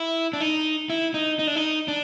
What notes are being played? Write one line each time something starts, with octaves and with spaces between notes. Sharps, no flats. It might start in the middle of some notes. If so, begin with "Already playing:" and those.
Already playing: E4
D4
D#4
E4
D#4
D#4
D4
D#4
D4